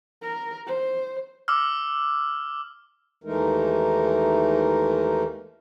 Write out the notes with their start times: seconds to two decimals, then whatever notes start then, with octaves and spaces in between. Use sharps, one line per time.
0.22 A#4
0.67 C5
1.48 D6 E6 F6
3.24 D#2 E3 G#3 A3 D#4 A#4